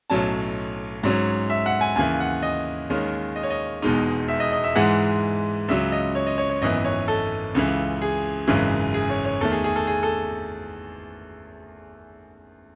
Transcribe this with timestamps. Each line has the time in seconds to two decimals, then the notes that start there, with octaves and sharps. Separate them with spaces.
0.10 B1 A2 F#3 C#4 A5
1.03 G#2 F#3 C#4
1.50 E5
1.66 F#5
1.81 G#5
1.96 D#2 C#3 E3 G#5
2.20 F#5
2.43 D#5
2.90 D#2 D#3 G#3 C#4
3.36 D#5
3.43 C#5
3.50 D#5
3.82 E1 E2 B2 G#3 D#4
4.28 E5
4.40 D#5
4.52 D#5
4.64 E5
4.75 G#2 E3 G#3 F#5
5.68 C#2 C#3 F#3 E5
5.92 D#5
6.15 C#5
6.27 D#5
6.38 C#5
6.50 C#5
6.62 G#1 F#2 E3 B3 D#5
6.85 C#5
7.08 A4
7.55 C#2 C#3 E3
8.02 G#4
8.47 G#1 F#2 C#3 E3 G#3
8.94 G#4
9.10 C#5
9.25 C#5
9.41 E2 D#3 A3 A4
9.52 G#4
9.64 G#4
9.76 A4
9.87 G#4
10.03 A4